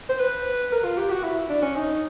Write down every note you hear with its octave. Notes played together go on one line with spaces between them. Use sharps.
C5
B4
A#4
F4
G4
F#4
E4
D4
C#4
D#4